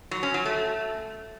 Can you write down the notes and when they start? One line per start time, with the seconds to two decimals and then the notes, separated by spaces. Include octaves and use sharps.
0.11 F#3
0.23 C#4
0.34 F#3
0.45 A3